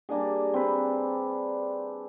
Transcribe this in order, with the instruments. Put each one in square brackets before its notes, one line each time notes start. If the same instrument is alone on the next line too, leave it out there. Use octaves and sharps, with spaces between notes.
[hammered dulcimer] G3 A#3 D4 G#4
C4 B4